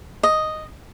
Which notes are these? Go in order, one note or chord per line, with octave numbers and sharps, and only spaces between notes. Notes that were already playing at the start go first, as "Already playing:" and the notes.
D#5